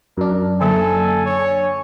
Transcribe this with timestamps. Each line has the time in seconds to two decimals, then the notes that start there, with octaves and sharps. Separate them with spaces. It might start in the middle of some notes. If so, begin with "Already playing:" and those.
0.17 F#2 D4 A#4
0.61 D3 F#3 A#3 A4 G#5
1.26 C#5